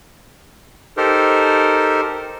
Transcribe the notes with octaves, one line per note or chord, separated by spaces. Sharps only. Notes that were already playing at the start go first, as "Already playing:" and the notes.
D#4 G4 A4 A#4 C5